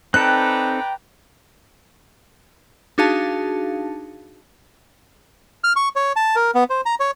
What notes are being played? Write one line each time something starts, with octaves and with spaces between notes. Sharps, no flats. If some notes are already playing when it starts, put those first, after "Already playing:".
C4 D#4 A4 B4 D5 G5 A#5 F#6
D4 D#4 F#4 G#4 F5 A5
F6
C#6
C#5
A5
A#4
B3
C5
A#5
C#5